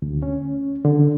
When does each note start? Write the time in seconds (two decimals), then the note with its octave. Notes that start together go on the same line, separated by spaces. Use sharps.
0.02 D2
0.23 C#4
0.85 D3